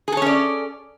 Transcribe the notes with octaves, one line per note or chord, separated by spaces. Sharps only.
C#4 G#4 A4 C#5 D5